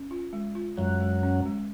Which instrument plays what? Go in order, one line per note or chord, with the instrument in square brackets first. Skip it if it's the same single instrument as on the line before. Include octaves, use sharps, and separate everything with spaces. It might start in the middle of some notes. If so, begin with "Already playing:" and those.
Already playing: [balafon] C#4
F4
G#3
F4
[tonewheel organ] F#2 F#3 [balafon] G#3
[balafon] G#3
C#4
G#3